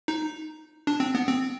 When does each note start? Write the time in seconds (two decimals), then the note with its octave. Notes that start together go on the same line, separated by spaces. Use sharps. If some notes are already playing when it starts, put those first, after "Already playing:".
0.08 D#4
0.87 D4
1.00 C4
1.15 B3
1.28 C4